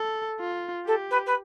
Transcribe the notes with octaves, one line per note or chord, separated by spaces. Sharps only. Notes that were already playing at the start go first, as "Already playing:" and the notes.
Already playing: A4
F4
G4 A4
B4
B4